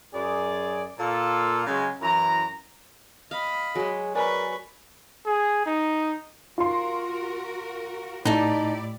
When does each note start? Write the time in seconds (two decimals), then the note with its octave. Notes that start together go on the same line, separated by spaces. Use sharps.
0.14 F#2 G#4 D5
0.98 A#2 F4 A4
1.66 C#3 F#3 G#3
2.01 F#2 E3 E4 A#5
3.31 D#5 F5 B5
3.75 F#3 G#3 G#4
4.15 A#4 B4 D5 G#5 C#6
5.26 G#4
5.66 D#4
6.58 F4 F#4 A#4 C6
8.25 A2 A3 D#4 E4 G4 D5 A5